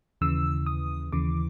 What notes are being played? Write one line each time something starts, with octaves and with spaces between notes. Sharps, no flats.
D#2 C#3 E3 E6
D#6
D#2 C#3 E3 D6